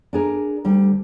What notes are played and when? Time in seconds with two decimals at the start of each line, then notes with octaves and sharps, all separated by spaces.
0.13 D4 G#4 A#4
0.65 D2 G3